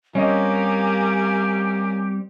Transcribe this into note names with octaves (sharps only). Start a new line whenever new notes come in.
G3 A#3 C4 C#4 G4 D#5 G#5